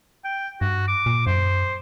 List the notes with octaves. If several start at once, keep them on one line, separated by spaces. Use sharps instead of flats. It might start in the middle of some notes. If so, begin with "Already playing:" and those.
G5
G2 F#4
D6
A#2
F#2 C5